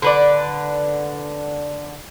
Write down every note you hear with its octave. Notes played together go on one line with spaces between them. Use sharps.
D3 B4 D5